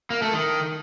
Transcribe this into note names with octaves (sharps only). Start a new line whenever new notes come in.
A#3
A3
D#3